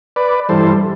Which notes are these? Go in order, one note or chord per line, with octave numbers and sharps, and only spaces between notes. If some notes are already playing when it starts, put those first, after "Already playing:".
B4 D5
G2 E3 G3 A4 C5